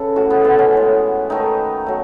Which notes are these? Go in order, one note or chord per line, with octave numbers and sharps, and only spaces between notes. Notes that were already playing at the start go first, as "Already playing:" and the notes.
Already playing: C#3 A4 B4
A2 E3 A3 F#4
B3
B3
C#4
A2 G#3
D#3 A3 D#4
F#3 A3